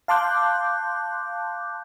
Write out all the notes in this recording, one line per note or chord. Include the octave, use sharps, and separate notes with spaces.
F5 A5 C6 D6 F#6 G6